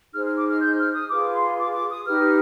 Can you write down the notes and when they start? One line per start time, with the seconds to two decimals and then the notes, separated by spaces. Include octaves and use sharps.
0.13 D#4 G#4 C5 F6
0.26 F6
0.37 D6
0.50 F6
0.62 G6
0.78 F6
0.93 D#6
1.10 F4 G#4 B4 D6
1.34 C6
1.58 D6
1.74 D6
1.90 D#6
2.06 D#4 G4 B4 F6